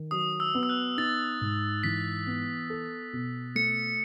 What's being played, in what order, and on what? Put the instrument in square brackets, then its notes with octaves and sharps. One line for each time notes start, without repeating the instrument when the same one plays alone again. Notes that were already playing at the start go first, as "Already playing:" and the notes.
Already playing: [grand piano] D#3
[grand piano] F#3 [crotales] D#6
[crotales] E6
[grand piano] B3
[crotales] E6
F#6
[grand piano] D#4 [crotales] A6
[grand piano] G#2
[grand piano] E3 [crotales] B6
[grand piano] B3
A4
B2
[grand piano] A3 [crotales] C#7